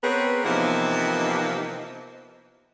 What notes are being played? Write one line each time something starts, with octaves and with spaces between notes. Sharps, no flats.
B3 C4 G#4 A#4 B4 C#5
C3 E3 F3 A#3 B3 D#4